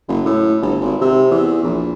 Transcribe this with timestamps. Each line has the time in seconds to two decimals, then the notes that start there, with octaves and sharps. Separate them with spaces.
0.08 F#1
0.25 A2
0.62 G1
0.81 G#1
1.01 C3
1.31 E2
1.64 A#1